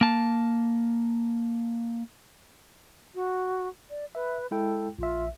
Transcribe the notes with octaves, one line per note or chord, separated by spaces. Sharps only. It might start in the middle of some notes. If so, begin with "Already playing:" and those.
A#3 A5
F#4
D5
B4 E5
G#3 E4 A4 G5
A#1 F4 E5